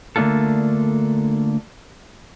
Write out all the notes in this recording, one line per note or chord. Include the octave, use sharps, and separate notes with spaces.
D3 A3 A#3 D4 F4 A4